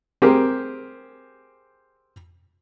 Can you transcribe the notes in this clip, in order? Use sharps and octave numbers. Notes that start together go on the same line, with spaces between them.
C4 G4 G#4 A#4